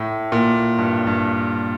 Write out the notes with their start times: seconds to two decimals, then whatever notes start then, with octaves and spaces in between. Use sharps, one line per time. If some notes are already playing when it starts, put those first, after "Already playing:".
Already playing: A2
0.32 A#2
0.78 G2
1.07 G2